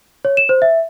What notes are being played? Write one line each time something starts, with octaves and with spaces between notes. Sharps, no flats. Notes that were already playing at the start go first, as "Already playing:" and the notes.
C#5
E7
C5
E5